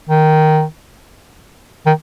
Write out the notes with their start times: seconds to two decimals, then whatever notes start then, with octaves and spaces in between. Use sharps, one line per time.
0.09 D#3
1.86 D#3